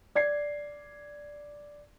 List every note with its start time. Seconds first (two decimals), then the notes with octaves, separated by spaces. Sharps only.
0.15 D5 G#6 C7